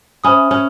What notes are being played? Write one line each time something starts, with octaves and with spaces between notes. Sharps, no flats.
C#4 C5 E5 G#5 B5 D#6
C#4